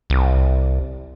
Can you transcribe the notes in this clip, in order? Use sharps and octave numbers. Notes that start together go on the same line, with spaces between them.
C2